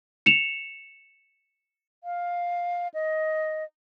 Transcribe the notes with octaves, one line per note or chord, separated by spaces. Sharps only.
C#7 E7 F7
F5
D#5